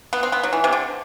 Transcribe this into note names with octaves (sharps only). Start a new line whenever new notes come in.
B3
C4
B3
F#3
E3
C3
D3